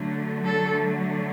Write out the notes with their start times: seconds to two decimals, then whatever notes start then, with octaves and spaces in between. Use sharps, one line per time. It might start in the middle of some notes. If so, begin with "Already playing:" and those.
Already playing: D3 F#3 A3
0.45 A4